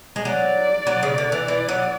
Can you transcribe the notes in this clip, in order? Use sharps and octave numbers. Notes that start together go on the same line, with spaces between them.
G#3
F#3 D5
F#3
C#3
D3
E3
E3 D5
F#3